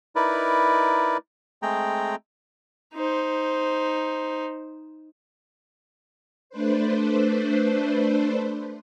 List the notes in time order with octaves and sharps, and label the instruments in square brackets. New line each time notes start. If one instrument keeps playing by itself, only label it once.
[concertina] D#4 E4 A#4 B4 D5
G#3 A3 C4 G#4 G5 A#5
[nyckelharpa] D#4 C5
[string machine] A3 D4 B4 C5